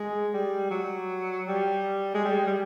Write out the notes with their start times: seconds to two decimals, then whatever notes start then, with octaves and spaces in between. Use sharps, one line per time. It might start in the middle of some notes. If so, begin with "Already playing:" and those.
Already playing: G#3
0.33 G3
0.70 F#3
1.48 G3
2.14 G#3
2.25 G3
2.47 G3